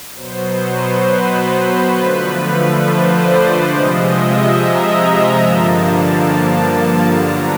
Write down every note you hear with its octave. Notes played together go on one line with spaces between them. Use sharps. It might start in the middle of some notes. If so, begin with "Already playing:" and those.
B2 F#3 B3 C5
C5
B4
D3 F3 A3
C5
D5
D5
C3 F3 G#3 D#5
E5
E5
A#5
G2 D3 F3 A#3 A5
A5
A5
A5
D3 F#3 B3 D4 A#5